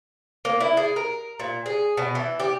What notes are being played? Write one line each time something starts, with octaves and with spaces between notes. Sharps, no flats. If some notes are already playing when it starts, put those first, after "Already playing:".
A#3
E4
G#4
A#4
A#2
G#4
B2
E3
G4